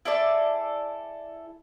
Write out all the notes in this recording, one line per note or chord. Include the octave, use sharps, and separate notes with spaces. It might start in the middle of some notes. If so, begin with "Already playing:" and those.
E4 G#4 A4 D5